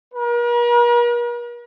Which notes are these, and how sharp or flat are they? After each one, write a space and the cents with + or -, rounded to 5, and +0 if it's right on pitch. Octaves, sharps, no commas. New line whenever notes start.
A#4 +45